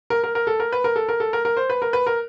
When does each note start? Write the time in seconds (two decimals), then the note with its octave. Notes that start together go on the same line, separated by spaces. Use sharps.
0.10 A#4
0.24 A#4
0.35 A#4
0.47 A4
0.60 A#4
0.72 B4
0.84 A#4
0.96 A4
1.09 A#4
1.20 A4
1.33 A#4
1.45 A#4
1.57 C5
1.70 B4
1.82 A#4
1.93 B4
2.07 A#4